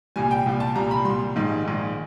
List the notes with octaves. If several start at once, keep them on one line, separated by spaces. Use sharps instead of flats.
C2 A#2 G3 G#5
G5
C2 A#2 G3
A5
C2 A#2 G3 A#5
B5
C2 A#2 G3 C6
A#1 G#2 D#3
A#1 G#2 D#3